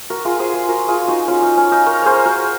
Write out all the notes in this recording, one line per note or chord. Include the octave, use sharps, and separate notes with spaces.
F#4 A#4
F4 G#4
G#4 C5
G#4 C5
F#4 A#4
F4 G#4
D#4 F#4
C#4 F4
D#4
C#4
D#4
A#4 C#5
G#4 C5 C#5
F#4 A#4